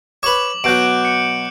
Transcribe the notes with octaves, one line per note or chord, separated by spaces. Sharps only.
B4 C#5 D6 F#7
B2 F#3 F#6 G6 D7
D7
C#7